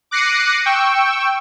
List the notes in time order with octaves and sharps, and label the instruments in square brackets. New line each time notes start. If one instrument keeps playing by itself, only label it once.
[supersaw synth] D6 F#6 A#6 C7 C#7 D#7
G5 C#6 E6